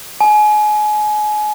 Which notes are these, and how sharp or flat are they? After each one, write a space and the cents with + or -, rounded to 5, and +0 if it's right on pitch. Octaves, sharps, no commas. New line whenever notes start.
G#5 +30